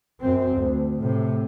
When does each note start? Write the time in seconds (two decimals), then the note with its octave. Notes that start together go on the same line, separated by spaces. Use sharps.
0.21 F#2 C4
0.57 D2
0.99 A2 C3